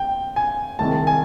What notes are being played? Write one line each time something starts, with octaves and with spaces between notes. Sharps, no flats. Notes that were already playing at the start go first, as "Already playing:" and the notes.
Already playing: G5
G#5
C2 C3 D#3 G#3 A5
G#5